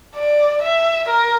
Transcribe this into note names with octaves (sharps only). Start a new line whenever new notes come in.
D5
E5
A#4